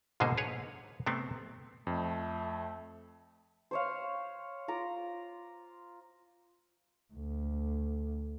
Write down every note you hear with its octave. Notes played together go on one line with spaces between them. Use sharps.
G#2 B2 D3 A#3 G#4 C5
G#4 B4 C#5
C3 A3 B3 C4
F2 A3
C5 C#5 F5
F4 A#5 D6
D2